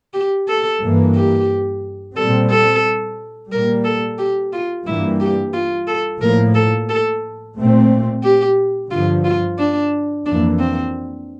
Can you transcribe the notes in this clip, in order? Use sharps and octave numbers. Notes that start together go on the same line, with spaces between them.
G4
A4
G2 E3 A#3
G4
A#2 G3 C4 A4
A4
A#2 G3 A#3 A#4
A4
G4
F4
G2 E3 G3 A#3 E4
G4
F4
A4
A2 F3 A#3 A#4
A4
A4
A#2 A3 C4
G4
G2 D3 F3 F4
F4
D4
F2 E3 A#3 D4
C4